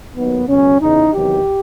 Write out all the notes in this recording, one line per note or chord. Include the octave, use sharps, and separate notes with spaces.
D#2 D#3 F#3 B3
C#2 B2 F#3 C#4
E2 C#3 E3 D#4
E2 C3 D#3 F#3 G4